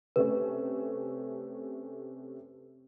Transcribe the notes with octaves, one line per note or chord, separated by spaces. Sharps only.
C3 A3 C#4 B4